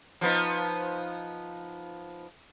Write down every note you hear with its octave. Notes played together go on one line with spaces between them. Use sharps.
F3 B3 D#4